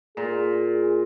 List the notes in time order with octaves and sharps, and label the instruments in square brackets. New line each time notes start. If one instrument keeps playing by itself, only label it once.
[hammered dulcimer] A#2 [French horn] G#4